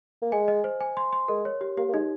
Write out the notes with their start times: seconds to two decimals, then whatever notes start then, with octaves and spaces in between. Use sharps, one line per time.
0.22 A#3
0.32 G#3 G#5
0.48 D#5
0.64 C5
0.81 G#5
0.97 C6
1.13 C6
1.28 G#3 A#4
1.45 C#5
1.61 G4
1.77 A#3 G4
1.88 A#3
1.93 G#3 D#4